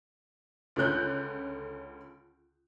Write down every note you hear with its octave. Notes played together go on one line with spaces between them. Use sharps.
C#2 D3 C#4 F#6 G6